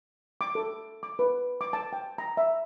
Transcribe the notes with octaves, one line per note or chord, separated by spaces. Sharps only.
D6
A4
D6
B4
D6
A5
G5
A#5
E5